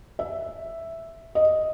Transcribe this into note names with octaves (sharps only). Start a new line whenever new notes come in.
E5
D#5